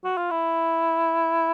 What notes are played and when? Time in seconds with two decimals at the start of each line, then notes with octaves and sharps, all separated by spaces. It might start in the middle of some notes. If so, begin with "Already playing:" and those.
0.04 F#4
0.17 F4
0.31 E4